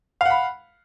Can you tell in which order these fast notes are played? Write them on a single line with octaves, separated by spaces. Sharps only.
F5 F#5 B5